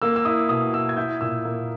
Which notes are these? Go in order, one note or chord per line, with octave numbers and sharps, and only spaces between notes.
A#3 E6
E6
E4 D#6
B2 D#6
E4 E6
G#6
E4 G6
A#2 E6
A#3